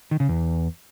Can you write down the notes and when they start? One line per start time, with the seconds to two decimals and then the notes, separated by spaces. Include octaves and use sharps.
0.11 D#3
0.20 C#3
0.29 E2